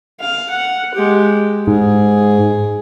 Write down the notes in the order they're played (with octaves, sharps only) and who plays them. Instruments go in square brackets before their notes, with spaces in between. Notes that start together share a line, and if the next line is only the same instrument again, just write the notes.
[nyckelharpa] F5
F#5
G#3 G4
[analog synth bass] G#2 [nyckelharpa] G#4